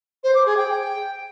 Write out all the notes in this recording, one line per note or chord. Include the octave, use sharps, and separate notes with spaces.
C5
D6
G#4
G5